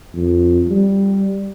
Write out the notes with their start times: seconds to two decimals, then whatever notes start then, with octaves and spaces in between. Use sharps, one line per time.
0.14 F2
0.69 G3